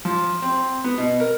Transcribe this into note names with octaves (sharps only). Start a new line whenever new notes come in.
F3
C4
B3
B2
A#4